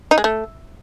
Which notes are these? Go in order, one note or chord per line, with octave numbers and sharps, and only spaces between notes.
D#4
G#3
A3